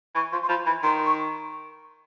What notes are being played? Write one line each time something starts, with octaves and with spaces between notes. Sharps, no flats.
E3 C#6
F3 C6
C6
F3 B5
E3 B5
D#3 C6
C#6